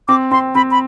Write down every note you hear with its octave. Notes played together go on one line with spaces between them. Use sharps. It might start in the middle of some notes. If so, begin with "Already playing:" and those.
C4 D6
C4 C6
C4 B5
B5